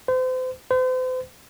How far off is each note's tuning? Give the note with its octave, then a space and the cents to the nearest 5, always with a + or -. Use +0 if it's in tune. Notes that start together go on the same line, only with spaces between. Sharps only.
C5 -35
C5 -40